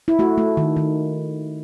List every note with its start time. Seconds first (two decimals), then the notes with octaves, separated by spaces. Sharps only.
0.08 E4
0.19 A3 F#4
0.38 A3
0.57 D#3
0.76 D#3